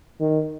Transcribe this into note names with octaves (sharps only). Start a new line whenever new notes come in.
D#3